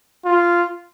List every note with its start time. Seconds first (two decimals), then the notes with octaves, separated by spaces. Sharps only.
0.25 F4